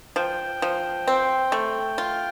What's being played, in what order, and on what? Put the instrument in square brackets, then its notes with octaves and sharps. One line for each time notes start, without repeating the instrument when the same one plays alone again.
[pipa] F3 [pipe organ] G5
[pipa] F3
C4
A3
F4